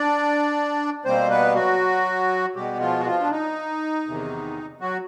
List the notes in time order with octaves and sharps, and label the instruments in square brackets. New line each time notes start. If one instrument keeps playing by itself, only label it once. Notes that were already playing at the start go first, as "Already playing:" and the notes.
Already playing: [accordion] D4 D5
B2 G3 A#3 C4 C5
B3 B4
F#3 F#4
B2 G3 G#3 B3 G4
F3 F4
F#4
F3 F4
D4
D#4
E2 C3 D#3
F#3 F#4